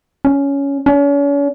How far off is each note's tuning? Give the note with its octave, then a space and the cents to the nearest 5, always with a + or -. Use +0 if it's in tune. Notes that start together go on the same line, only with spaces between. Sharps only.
C#4 +10
C#4 +40